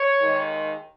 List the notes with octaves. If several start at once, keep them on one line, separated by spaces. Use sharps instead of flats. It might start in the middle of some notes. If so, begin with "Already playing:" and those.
Already playing: C#5
D#2 D#3 G#3